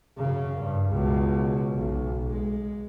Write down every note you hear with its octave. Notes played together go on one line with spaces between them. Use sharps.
F#2 C#3
G2
C#2 B2
B1
G#3